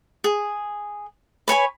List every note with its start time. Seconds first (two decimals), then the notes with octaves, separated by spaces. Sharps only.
0.24 G#4
1.48 B4 C#5 G#5 B5